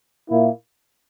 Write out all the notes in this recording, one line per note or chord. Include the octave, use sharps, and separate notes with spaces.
A#2 A#3 E4